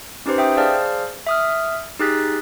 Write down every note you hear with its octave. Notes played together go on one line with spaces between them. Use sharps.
C#4 D#4 G4 B4 C5
E5 G5 D#6
G#4 C5 D5 F5 A5 F6
E5 D#6 F6
D#4 G4 G#4 F#6 A6 B6